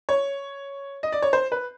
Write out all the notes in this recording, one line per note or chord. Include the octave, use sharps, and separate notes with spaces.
C#5
D#5
D5
C#5
C5
B4